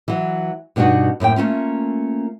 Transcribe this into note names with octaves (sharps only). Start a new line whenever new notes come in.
E3 F#3
G2 B2 D4 D#4 F#4
F#2 A2 A#3 G5
A3 A#3 C#4 F4